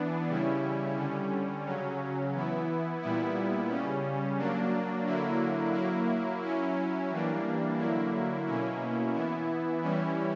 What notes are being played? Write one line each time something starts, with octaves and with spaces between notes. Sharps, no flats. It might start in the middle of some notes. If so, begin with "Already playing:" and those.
Already playing: E3 B3 D4
C#3 G3 C#4 E4
D3 G3 C#4
C#3 F#3 C#4
E3 B3 E4
A#2 G3 B3 E4
C#3 G3 C#4
F#3 A#3 D4
D3 F#3 A#3 E4
F#3 A#3 E4
F#3 C#4 E4
E3 G3 A#3 D4
D3 F#3 A#3 E4
B2 A#3 C#4 E4
E3 B3 E4
E3 G3 C#4 E4